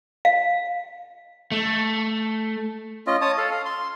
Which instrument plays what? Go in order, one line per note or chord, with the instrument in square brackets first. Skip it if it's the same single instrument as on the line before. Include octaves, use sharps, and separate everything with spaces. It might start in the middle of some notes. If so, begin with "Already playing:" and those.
[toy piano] F5
[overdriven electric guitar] A3
[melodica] C#4 F4 D#5
C#5 A5 D#6
A4 F5
F5
C6